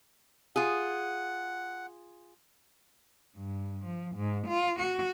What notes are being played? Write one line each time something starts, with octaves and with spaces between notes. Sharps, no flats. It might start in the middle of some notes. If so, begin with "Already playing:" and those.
F4 G#4 F#5
G2
F3
G#2
F4
F#4